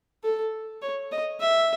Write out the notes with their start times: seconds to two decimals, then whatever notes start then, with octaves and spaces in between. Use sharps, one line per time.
0.24 A4
0.82 C#5
1.12 D#5
1.41 E5